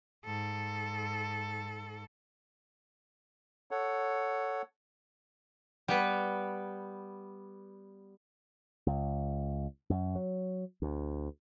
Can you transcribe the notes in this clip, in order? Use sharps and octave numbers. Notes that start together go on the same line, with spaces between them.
G#2 A4
A4 C#5 F#5
G3 B3 B4
C#2
F#2
F#3
D2